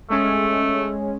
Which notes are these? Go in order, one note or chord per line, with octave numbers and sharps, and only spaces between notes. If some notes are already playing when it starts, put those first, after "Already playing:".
G#3 A3 C#4